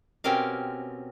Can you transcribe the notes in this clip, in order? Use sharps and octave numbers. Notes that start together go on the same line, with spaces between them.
B2 C4 C#4 G4 A#4 F5